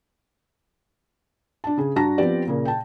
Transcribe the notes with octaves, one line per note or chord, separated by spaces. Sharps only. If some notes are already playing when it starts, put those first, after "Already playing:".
D4 A5
C#3 G#4
G2 D4 F#4 A5 A#5 A#6
F3 B3 C4 G4 D5
A#2 C#3 A#3
G5 A5